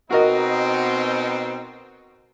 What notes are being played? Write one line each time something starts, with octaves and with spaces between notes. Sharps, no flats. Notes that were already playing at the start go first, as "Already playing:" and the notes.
B2 C4 D#4 F#4 A#4 D#5